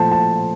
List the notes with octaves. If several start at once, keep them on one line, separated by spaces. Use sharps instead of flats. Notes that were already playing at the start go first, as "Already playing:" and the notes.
Already playing: A#2 F3 A3 C5 A5
A5